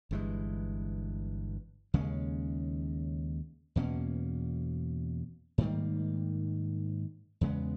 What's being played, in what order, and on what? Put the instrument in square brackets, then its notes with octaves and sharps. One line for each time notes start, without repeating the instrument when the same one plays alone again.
[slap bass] G1 G2 E3 G#3
D#2 C#3 G#3 C#4
E2 B2 A#3 C#4
G#2 D#3 G3 A#3
E2 C#3 G#3 B3